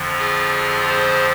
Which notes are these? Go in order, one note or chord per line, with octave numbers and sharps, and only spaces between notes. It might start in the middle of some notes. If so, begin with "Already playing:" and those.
Already playing: F2 D3 F3
F4 G#4
G#4 C5